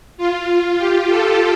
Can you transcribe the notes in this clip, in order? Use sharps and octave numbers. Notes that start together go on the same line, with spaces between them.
F4
G4
A4